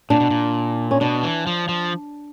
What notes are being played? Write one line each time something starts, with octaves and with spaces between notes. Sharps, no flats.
A#2 D4
B2
A#2
C#4
B2 D4
E3
F3
F3